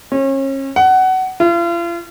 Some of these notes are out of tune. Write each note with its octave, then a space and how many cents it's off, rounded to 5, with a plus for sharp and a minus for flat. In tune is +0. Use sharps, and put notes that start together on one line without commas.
C#4 -35
F#5 +20
F4 -40